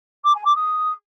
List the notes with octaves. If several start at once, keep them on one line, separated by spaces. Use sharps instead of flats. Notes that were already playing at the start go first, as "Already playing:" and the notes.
D6
G#5
D6
D#6